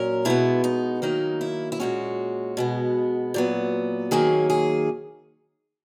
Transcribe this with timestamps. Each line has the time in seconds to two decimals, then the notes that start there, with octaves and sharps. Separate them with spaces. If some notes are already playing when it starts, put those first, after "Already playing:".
Already playing: A#2 F#3 C#4 A#4
0.25 B2 G#3 B3 E4
0.64 D#4
1.02 D#3 F#3 A#3 D#4
1.41 E4
1.72 E4
1.80 A#2 G#3 C#4 F#4
2.57 B2 G#3 B3
3.34 A#2 F#3 B3
4.11 D#3 F#3 A#3 C#4 G#4
4.50 G#4